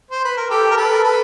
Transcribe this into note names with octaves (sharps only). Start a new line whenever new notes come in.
C5
B4
A#4
G4 A4
A#4
A4 B4
A#4
A4 B4